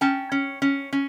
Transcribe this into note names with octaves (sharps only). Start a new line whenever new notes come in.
C#4 G5 A5
C#4
C#4
C#4